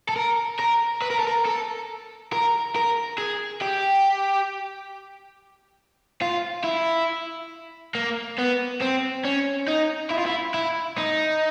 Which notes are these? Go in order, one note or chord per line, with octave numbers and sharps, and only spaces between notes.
A4
A#4
A#4
B4
A#4
A4
A#4
A4
A#4
A#4
G#4
G4
F4
E4
A#3
B3
C4
C#4
D#4
E4
F4
E4
E4
D#4